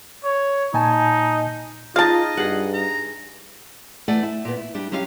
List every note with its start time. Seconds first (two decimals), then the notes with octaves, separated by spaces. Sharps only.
0.24 C#5
0.74 A#2 D#4 G#5 A5
1.96 D#4 F4 G#4 D#5 F5 A5
2.37 G2 G#4 F#5
2.74 A#5
4.08 E2 A3 D5 F#5 G#5
4.23 E4
4.45 A#2 B3
4.57 E4
4.74 G3 D4 E4
4.91 F#3 G3 C#4 E4 G4 F5